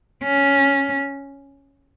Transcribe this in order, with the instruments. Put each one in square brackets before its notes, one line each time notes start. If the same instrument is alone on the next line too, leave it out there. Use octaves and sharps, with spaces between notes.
[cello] C#4